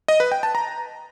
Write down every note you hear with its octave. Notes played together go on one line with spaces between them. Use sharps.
D#5
B4
G5
A5
A#5